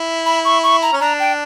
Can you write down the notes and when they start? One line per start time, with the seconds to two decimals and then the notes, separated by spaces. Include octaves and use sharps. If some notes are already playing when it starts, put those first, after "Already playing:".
Already playing: E4
0.26 B5
0.45 C#6
0.63 C#6
0.82 A#5
0.93 C#4
1.00 D4 A#5
1.20 G5